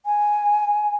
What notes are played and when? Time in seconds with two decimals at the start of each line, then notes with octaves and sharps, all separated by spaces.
0.06 G#5